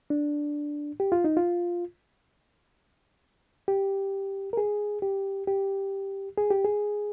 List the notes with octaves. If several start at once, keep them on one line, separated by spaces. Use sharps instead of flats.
D4
G4
F4
D#4
F4
G4
A#4
G#4
G4
G4
G#4
G4
G#4